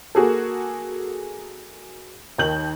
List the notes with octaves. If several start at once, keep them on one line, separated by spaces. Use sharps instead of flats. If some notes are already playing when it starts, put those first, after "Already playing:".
A#3 F#4 G#4 A4
D#2 D#3 G6 F#7